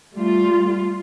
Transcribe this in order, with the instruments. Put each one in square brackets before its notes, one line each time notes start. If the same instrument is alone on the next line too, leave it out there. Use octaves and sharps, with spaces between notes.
[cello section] G3 A3 F4